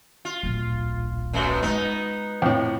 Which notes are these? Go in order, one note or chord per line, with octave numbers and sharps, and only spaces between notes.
F4
D1 A#1
F#2 A#2 A3
G#3 B3 D#4
F2 A2